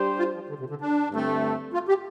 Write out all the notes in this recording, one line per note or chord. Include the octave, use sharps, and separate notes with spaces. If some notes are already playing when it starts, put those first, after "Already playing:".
Already playing: G3 D4 G4 C5
F4
F3
D3
C3
D3
D4
G2 D3 A3 C4
F4
G4